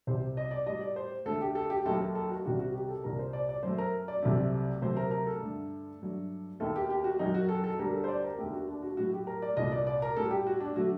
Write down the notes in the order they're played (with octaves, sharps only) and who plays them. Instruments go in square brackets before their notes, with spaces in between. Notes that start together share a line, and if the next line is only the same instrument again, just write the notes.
[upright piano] C2 C3 G3 C5
D#5
D5
A2 G3 D#5
D5
C5
D2 D3 A3 A4
G4
A4
G4
D#2 D#3 F#3 A3 A4
A4
A4
F#4
C2 C3 D#3 G3 F#4
F#4
G4
A4
C2 A#2 G3 A#4
C5
D5
D5
F#2 F#3 A3 C5
A#4
D5
C2 C3 F#3 A3
D2 C3 F#3 A3 C5
A#4
A#4
A4
G2 D3 A3
G2 F#3 A3
D#2 D#3 A3 A4
G4
G4
F#4
F#2 D#3 F#3 D#4
F#4
A4
A4
D2 D3 G3 A#4
A4
C5
D5
A#4
D#2 D3 A3 G4
F#4
D4
F#4
A2 F#3 A3 F#4
G4
A#4
D5
C2 A#2 A3 D#5
D5
D5
A#4
A2 G3 A4
G4
F#4
D4
D3 F#3 A3 F#4